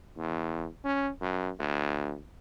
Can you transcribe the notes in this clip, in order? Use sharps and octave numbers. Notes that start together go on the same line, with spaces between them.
E2
C#4
F#2
D2